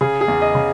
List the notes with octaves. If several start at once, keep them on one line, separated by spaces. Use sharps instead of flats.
C#3 G#4
G#4
E2
D#5
C#3